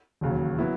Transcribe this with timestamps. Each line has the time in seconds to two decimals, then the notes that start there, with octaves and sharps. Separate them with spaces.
0.21 E1 D#2 C#3 F#3
0.58 F#3 B3 E4